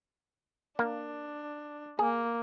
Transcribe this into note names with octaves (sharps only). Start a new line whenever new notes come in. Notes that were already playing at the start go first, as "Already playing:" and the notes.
A#3 D4
A#3 G#4